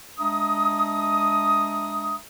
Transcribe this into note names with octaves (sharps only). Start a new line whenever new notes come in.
G#3 D4 E5 A#5 D#6